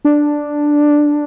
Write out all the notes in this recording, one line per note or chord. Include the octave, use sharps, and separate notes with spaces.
D4